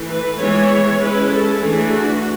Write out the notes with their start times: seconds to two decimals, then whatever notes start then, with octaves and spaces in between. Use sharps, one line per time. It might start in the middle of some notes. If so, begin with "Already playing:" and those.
Already playing: E3 A3 E4
0.10 B4
0.40 E3 G#3 B3 E4 C#5
1.01 G#3 C#4 E4 B4
1.31 A4
1.62 E3 A3 D4 G#4
1.92 F#4